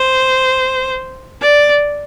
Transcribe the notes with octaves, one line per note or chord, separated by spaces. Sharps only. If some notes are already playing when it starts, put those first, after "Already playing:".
Already playing: C5
D5